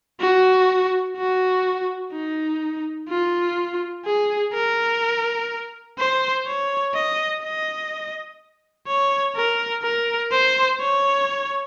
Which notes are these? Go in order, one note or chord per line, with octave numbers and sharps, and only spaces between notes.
F#4
F#4
D#4
F4
G#4
A#4
C5
C#5
D#5
D#5
C#5
A#4
A#4
C5
C#5